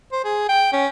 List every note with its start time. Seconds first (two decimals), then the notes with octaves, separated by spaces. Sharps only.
0.12 C5
0.24 G#4
0.49 G5
0.73 C#4